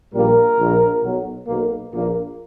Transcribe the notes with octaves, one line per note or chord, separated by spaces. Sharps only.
A#1 A#2 G3 A#3 A#4
A#1 A#2 A#3
B1 B2 F#3
B1 B2 A#3
A#1 A#2 A#3